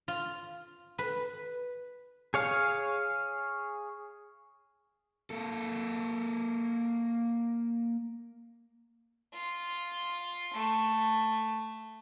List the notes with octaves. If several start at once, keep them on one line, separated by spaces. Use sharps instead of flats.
F4
B4
G#4 C#5 F5
A#3 A4
F4
A3